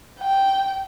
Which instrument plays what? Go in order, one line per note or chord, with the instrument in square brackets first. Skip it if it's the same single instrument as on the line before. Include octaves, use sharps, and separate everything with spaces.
[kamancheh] G5